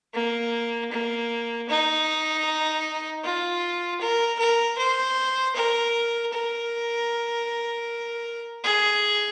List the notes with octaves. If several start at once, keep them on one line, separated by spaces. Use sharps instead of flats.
A#3
A#3
D#4
F4
A#4
A#4
C5
A#4
A#4
G#4